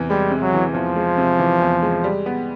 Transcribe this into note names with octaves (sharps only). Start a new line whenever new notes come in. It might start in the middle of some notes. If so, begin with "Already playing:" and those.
Already playing: E2 C3 E3
G3 G#3
C3
F#3
E3
E2 F3
G#3
C3
E3
E2
G#3
G3
B3